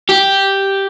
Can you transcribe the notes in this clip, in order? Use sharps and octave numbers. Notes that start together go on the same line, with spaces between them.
G4